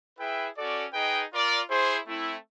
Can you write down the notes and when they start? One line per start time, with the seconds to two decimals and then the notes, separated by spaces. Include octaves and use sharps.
0.18 E4 G#4 B4 E5 G5
0.57 C#4 F#4 A4 D5
0.93 D#4 G#4 B4 D#5 G5
1.31 F4 A#4 D5
1.69 E4 G#4 C5
2.06 A3 C4 E4